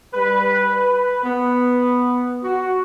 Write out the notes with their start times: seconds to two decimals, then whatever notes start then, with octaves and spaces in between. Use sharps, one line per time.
0.13 G3 B4
0.68 B4
1.23 B3
2.42 F#4